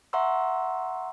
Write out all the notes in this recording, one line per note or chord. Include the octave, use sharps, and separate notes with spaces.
E5 F#5 A#5 C6 C#6 E6